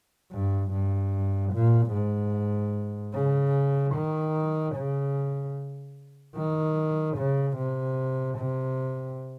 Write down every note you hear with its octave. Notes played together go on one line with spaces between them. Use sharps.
G2
G2
A#2
G#2
C#3
D#3
C#3
D#3
C#3
C3
C3